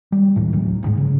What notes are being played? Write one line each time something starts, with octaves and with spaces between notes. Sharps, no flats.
G3
D#2 A2
E1 D2 F#3
A1 G#2
C#3